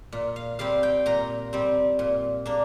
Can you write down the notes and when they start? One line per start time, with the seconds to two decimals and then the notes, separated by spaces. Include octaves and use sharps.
0.12 A#2
0.36 F5
0.59 G3 C4 F5
0.83 G5
1.06 A#2 A#5
1.53 G3 C4
1.99 A#2
2.46 A#3 D4